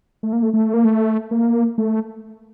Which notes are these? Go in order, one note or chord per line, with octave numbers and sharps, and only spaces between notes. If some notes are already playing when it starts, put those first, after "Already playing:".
A3
A#3
A3
A3
A#3
A3
A#3
A3